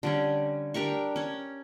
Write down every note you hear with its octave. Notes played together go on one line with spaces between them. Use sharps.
D3 G3 C#4
D4 G4 A#4 C#6
C#4 C#5